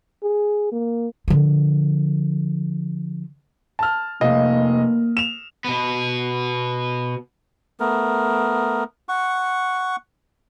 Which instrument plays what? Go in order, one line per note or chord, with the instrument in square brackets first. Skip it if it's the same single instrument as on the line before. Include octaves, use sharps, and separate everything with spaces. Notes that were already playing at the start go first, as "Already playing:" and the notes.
[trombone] G#4
A#3
[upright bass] D3 F3
[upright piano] A5 F6
[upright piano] F1 D#5 F5 [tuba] A#3
[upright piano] E7 F7
[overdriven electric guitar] B2 B3
[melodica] A3 B3 A#4
F#5 C#6